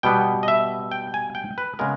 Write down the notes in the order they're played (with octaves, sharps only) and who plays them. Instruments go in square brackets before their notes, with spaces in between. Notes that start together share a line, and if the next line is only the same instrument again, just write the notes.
[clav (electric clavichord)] B2 G3 B3 G5
D#5
E5
G5
G#5
G5
B4
C#3 G#3 B3 A#4